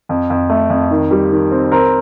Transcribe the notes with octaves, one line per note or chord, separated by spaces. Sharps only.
F2
F2
A3
F2
D#3
G3
D#3
C4
C4 A#4